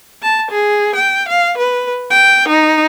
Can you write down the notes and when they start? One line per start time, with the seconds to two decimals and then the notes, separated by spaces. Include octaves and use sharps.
0.22 A5
0.51 G#4
0.95 G5
1.28 F5
1.58 B4
2.10 G5
2.48 D#4